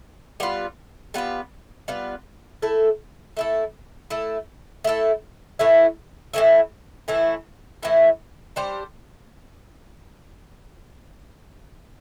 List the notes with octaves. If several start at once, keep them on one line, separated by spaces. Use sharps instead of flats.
G3 B3 F4 B4
G3 B3 F4 B4
G3 B3 F4 B4
A3 E4 A4
A3 E4 A4
A3 E4 A4
A3 E4 A4
A2 E3 A3 E4
A2 E3 A3 E4
A2 E3 A3 E4
A2 E3 A3 E4
G3 D4 G4 C5